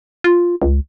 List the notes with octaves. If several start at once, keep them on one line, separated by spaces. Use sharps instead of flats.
F4
C#2